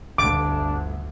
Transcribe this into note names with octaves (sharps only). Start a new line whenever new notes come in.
G1 D2 D4 D6